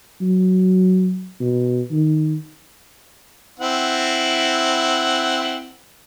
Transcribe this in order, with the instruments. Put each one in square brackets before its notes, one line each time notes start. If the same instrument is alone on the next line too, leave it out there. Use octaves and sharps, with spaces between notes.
[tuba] F#3
B2
D#3
[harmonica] C4 E4 F#5